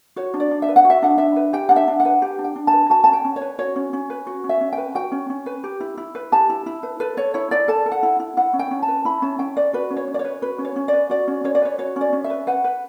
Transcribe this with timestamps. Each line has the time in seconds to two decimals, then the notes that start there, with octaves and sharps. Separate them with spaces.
0.16 F#4 C#5
0.34 D4
0.40 D5
0.51 D4
0.62 E5
0.68 B4
0.76 F#5
0.85 F#4
0.90 E5
1.02 D4 F#5
1.18 D4 E5
1.36 B4
1.53 G4 G5
1.69 D4 F#5
1.76 E5
1.88 D4
2.00 F#5
2.05 B4
2.22 G4
2.39 D4
2.44 G5
2.56 D4
2.67 A5
2.73 B4
2.90 F#4 A5
3.04 C#4 A5
3.13 G5
3.25 C#4
3.36 C#5
3.41 B4
3.58 F#4 C#5
3.76 C#4
3.93 C#4
4.10 B4
4.27 F#4
4.44 C#4
4.49 E5
4.61 C#4
4.72 G5
4.78 B4
4.95 F#4 G5
5.12 C#4
5.30 C#4
5.46 B4
5.64 G4
5.80 E4
5.97 E4
6.15 B4
6.32 G4 A5
6.49 E4
6.66 E4
6.83 B4
7.00 A4 B4
7.17 A4 C#5
7.34 E4 C#5
7.51 E4 D5
7.68 A4 A5
7.86 A4
7.92 F#5
8.03 E4
8.20 E4
8.37 E4 F#5
8.53 C#4
8.59 G5
8.71 C#4
8.82 A5
8.88 B4
9.05 E4 B5
9.22 C#4 A5
9.39 C#4 G5
9.56 B4 D5
9.73 F#4 B4
9.91 C#4
9.97 C#5
10.08 C#4
10.14 D5
10.19 C#5
10.25 B4
10.42 F#4 B4
10.59 C#4
10.65 C#5
10.76 C#4
10.88 B4 D5
11.10 F#4 D5
11.28 C#4
11.44 C#4 C#5
11.55 D5
11.62 B4 C#5
11.78 F#4 C#5
11.96 C#4 D5
12.13 C#4
12.24 E5
12.30 B4
12.47 B4 F#5
12.64 B4